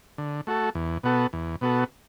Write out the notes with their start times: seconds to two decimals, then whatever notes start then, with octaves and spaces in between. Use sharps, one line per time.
0.18 D3
0.47 A3 F#4 A4
0.75 E2
1.03 B2 B3 F#4 A4
1.33 E2
1.61 B2 B3 F#4 A4